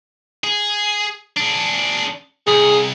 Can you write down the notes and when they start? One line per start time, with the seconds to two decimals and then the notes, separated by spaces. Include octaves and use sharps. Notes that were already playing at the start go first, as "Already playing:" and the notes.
0.44 G#4
1.37 D4 G#4
2.47 C2 G#4